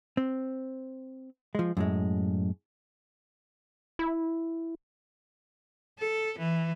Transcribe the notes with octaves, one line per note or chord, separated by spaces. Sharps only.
C4
F3 G#3
F#2 A2 G#3
E4
A4
E3